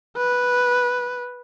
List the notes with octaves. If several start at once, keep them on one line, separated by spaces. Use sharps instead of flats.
B4